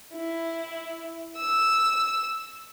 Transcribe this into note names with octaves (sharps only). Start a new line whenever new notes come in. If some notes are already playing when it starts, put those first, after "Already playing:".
E4
E6